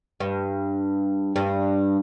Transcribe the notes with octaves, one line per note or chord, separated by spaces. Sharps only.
G2
G2